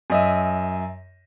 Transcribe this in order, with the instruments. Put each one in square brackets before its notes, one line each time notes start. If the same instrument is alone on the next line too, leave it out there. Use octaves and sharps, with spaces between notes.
[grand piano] F#2 D#5 E5